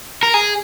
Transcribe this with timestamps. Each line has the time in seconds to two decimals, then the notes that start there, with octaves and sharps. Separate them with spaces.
0.23 A#4
0.34 G#4